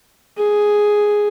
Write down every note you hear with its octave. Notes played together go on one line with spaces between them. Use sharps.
G#4